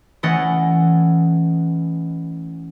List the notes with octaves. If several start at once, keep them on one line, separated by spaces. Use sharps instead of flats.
E3 A3 C#4 D#5 F#5 A6